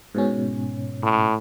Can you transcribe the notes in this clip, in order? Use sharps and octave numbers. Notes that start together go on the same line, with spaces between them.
G#2 B2 C#4
A2